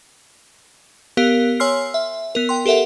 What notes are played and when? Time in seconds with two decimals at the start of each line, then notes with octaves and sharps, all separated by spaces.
1.17 B3 G4 A#4 F5
1.60 C#5 G#5 C6 E6 F6 C7
1.94 E5
2.35 B3 A#4
2.49 G5 C6
2.66 G4 A4 A#4 E5 F#5